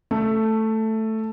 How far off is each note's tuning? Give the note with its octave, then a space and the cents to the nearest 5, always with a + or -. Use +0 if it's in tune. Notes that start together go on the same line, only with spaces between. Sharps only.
A3 +5